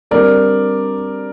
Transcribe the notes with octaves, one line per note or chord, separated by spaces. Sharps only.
D3 G3 C4 A#4 D5